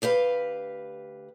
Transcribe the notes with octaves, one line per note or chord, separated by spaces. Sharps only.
D2 G4 B4 F5